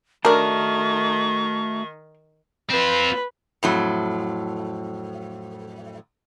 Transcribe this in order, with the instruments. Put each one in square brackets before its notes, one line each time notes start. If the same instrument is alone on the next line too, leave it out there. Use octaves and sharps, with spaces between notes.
[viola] D#3 [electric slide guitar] A3 F#4 A5 [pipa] D4 A#4 [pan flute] C#6
[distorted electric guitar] C4 F4 [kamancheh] B4
[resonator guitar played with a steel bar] F2 A2 F#3